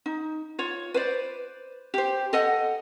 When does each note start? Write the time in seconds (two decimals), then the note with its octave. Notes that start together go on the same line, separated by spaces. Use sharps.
0.06 D#4
0.59 F4 C#5
0.94 B4 C5 D5
1.94 G4 C5
2.33 A4 D#5 F#5